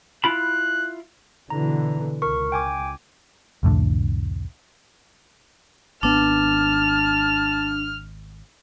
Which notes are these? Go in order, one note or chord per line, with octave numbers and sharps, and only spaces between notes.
E4 F4 B5 F#6
B2 D3 E3 A#5
C#2 A#4 C#6
G5 G#5 D6
C2 F2 A2 D3
G#1 B3 D4 A5 F6